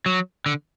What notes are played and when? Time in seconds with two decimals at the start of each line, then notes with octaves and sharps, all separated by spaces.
0.06 F#3
0.46 D3